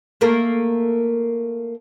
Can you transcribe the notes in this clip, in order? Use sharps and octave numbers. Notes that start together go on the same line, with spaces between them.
A3 A#3 A#4